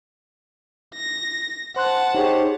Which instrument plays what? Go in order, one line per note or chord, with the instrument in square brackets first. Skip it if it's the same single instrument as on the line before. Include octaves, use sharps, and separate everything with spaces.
[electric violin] A#6
[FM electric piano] C5 C6 F#6 [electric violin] F#5 A5
[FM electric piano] D#4 G#4 [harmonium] G4 C5 C#5